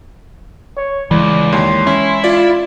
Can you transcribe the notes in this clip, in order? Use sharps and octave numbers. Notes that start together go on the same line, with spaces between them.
C#5
C#2 E3 G#3 D5
D#2 C#5 C6
C#4 E4
F4 D5